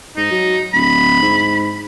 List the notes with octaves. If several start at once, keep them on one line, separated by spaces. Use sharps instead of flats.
G#2 D#4
F#3
D1 B5
G#2